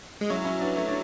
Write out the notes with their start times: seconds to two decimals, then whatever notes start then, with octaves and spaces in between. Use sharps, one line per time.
0.21 G#3
0.30 F#3 C#4 E4
0.45 C#4 E4
0.60 B3 D4
0.77 A3 C#4
0.88 D4